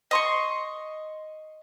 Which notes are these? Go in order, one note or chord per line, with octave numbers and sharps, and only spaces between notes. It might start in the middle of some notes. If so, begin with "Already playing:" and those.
D#5 C6 C#6